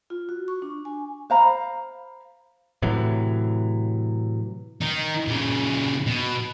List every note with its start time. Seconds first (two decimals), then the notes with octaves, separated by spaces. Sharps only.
0.10 F4
0.29 F#4
0.48 C#6
0.62 D4
0.85 G#5
1.30 C5 F5 A#5 B5
2.82 A2 C3 E3 F#3
4.81 D#3 D#4
5.27 A#2 C#3
6.06 B2